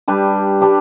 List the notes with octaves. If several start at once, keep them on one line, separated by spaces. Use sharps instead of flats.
G3 D4 G4 B4
G3 D4 G4 B4